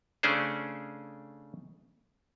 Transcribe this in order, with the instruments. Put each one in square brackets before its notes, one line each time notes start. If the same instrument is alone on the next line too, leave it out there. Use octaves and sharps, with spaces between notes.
[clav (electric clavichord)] C#3 A3 C#4 D4 G#4 C5